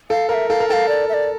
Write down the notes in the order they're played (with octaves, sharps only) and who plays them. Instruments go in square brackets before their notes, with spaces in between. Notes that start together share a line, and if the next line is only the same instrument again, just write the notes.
[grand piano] A4 [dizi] F5
[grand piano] A#4 [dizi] F5
[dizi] E5
[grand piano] A4 [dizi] F5
[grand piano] A#4
[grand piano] A4 [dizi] F5 G5
[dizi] D5
E5
D5